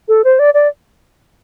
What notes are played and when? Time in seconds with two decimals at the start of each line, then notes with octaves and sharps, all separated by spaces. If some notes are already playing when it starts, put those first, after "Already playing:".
0.08 A4
0.24 C5
0.39 D5
0.54 D5